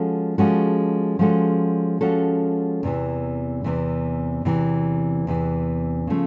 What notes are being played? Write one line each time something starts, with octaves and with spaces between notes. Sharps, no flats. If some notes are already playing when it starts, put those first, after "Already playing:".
Already playing: F3 G#3 C#4 F#4 A4
F3 G#3 C#4 F#4 A4
F3 G#3 C#4 F#4 A4
F3 G#3 C#4 F#4 A4
E2 C3 E3
E2 C3 E3
E2 C3 E3
E2 C3 E3
C#3 F3 A3